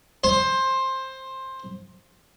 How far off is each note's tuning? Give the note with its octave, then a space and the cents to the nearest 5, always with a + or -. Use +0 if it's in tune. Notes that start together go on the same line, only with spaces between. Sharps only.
C5 +15